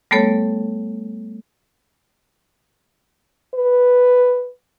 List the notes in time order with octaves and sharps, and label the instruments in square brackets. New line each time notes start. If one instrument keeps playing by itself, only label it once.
[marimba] G3 A3 B3 A4 C#5
[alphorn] B4